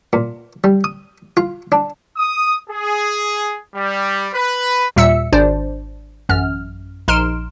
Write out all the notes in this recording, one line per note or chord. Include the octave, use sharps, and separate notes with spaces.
A#2
G3
D#6
F4
D4
D#6
G#4
G3
B4
D#2 A#2 G3 E5 E6 C#7
G#1 D4 C5 D5
A1 F#2 F6
A#1 D#4 C6 F6 D7 E7